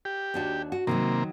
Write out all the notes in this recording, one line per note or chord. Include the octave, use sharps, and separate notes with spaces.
G4
D#2 D4 F#4
F#4
C3 D#3 F3 F#3 A#3